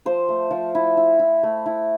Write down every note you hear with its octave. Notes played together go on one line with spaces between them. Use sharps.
F3 C5
A3
F3
E4
E4
E4
A3
E4